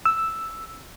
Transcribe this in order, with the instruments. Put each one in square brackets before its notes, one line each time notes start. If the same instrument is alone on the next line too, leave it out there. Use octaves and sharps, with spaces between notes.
[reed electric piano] E6